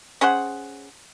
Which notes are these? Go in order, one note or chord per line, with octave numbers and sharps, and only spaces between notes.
C#4 G#4 C5 F#5